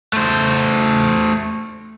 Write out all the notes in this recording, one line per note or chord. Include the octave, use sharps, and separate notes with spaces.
A3 C5